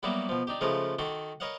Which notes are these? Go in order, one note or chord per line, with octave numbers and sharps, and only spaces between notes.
F#3 G3 A#3 B3 E4 F#4
B2 F3
D4 D#4 G4
C#3 F3 G#3 A3 A#4 B4
D#3 F#4 A4 C6 D6
A#4 B4 C#5 D#5 F5 F#5